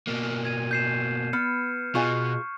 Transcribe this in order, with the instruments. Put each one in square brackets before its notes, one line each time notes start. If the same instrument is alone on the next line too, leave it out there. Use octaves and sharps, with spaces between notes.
[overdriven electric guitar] B2 A#3
[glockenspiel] G#6 D#7
G6 C7 E7
[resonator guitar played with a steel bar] B3 [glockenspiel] F6 C#7
[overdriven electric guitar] B2 [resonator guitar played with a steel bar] F4 G#4 D#5 [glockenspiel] C#6